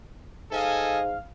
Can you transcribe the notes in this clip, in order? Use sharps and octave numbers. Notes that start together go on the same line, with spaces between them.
G#2 A4 D#5 F5 G#5